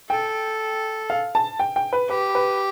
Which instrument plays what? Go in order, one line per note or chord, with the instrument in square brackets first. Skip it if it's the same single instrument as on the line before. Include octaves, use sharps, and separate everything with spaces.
[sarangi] A4 [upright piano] G5
[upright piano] F5
A5
G5
G5
B4
[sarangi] G4 [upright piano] B4
[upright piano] B4